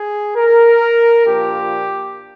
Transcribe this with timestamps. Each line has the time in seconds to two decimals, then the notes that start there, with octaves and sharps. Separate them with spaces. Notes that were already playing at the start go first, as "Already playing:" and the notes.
Already playing: G#4
0.36 A#4
1.26 A#2 F3 A#3 D4 F4 G4